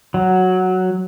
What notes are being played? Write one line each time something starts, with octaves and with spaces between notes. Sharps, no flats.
F#3